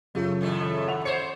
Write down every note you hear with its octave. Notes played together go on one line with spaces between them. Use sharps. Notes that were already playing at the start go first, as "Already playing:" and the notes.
F#2 C#3 A3 F4
D#2 A2 A3
F#5 F7
C5 C#5 C#7